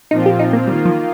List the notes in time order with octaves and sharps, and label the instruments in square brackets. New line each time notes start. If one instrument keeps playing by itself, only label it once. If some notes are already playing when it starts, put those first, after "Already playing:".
[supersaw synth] A#2 F3 C4 F4 [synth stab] D#4
[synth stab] G4
D#4
A#3
[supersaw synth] D#3 A#3 F4 [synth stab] G3
[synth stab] F3